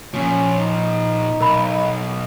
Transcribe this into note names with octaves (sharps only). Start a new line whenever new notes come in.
A#2 F3 C#4
D#4
B1 A#4 B5